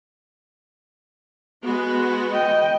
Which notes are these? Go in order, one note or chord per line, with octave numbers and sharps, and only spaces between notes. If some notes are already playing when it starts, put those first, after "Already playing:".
G#3 B3 F#4
D#5 G5